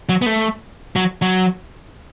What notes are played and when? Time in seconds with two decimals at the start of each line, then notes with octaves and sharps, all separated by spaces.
0.09 F#3
0.22 B3
0.26 A3
0.96 F#3
1.22 F#3